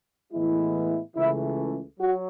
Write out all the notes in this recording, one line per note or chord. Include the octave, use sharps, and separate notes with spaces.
A2 E3 G#3 B3 E4
C#2 C#3 E3 A3 E4
F#3 F#4